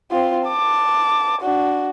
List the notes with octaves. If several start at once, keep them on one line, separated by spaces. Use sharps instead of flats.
C4 F4
A5 D6
D4 F#4